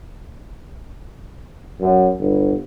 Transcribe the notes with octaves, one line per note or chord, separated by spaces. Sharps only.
F#2
G1